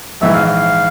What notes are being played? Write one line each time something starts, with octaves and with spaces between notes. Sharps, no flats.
A#1 G#2 E3 E5
F5
F5